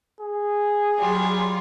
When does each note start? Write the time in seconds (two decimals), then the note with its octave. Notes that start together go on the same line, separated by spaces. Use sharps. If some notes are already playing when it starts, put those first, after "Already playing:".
0.20 G#4
0.97 F#3 G3 F4